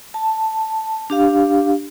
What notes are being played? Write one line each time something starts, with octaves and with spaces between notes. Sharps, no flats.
A5
D4 G4 F5